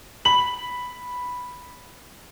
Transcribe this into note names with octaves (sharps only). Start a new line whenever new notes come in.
B5 F#7